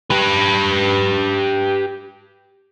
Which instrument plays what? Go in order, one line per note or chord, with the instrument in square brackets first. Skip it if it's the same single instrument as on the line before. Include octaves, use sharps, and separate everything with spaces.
[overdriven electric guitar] G4 B4